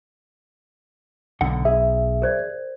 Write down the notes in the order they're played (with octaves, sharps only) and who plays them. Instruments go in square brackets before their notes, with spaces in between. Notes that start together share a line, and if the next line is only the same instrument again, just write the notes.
[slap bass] B1 [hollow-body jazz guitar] D3 F#5
[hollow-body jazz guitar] G#4 [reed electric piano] E5
[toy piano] A#4 C5 D5